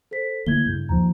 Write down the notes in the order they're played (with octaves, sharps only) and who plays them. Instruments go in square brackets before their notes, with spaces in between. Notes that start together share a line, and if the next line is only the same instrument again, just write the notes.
[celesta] A4 C5 B6
[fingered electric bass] D3 A3 A#3 [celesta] E4 G#6 G7
[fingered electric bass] G2 C#3 [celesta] G6
[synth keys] D#2 F3 [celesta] A#5